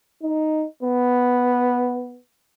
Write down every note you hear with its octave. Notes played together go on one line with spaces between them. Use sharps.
D#4
B3